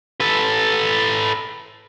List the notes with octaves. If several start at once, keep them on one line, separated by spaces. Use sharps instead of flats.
A4 B4